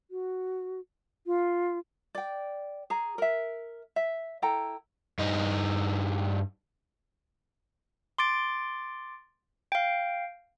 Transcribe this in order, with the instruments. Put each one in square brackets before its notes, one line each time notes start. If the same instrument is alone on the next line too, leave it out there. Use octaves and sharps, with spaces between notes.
[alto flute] F#4
F4
[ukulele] D5 G5
G#4 A#5
A#4 E5
E5
E4 A4 G5 A#5
[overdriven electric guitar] G2 D#4
[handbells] C6 D6 A6 D7
F5 G5